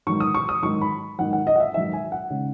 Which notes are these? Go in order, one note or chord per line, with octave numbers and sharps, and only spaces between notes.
G#2 D#3 F#3 C#6
D#6
C#6
D#6
G#2 D#3 F#3 C#6
B5
G#2 D#3 F#3 F#5
F#5
D#5
F#5
E5
G#2 D#3 F#3 E5
G#5
F#5
C#3 G#3 D#4